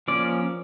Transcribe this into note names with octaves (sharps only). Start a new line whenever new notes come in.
F3 A#3 C#4 D5